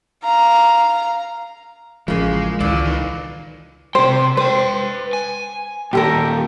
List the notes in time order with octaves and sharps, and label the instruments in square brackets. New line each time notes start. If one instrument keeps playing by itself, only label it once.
[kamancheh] F5 A#5
[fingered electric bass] A1 F3 [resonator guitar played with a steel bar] C#3 A#3 [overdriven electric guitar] G#3
[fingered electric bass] C#2 D#3 E3 [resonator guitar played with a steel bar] A#2 F#3 [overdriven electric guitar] A4 D5
[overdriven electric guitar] D#4 B4
[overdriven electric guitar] C3 G5 [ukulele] C5
[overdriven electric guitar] B4 G5 [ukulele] C5
[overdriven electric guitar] G#5
[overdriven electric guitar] D#2 A#2 [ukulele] G4 A4 A#4